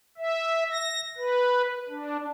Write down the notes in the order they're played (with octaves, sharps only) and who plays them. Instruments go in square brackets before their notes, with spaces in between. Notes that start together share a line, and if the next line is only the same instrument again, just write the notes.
[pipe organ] E5
A#6
B4
D4